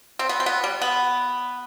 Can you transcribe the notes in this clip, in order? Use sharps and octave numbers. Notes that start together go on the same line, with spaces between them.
C4
B3
C4
B3
G3
B3